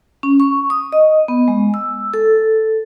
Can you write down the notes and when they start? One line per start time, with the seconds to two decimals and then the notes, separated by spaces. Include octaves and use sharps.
0.23 C#4
0.40 C#6
0.70 D#6
0.92 D#5
1.28 B3
1.48 G#3
1.74 E6
2.14 A4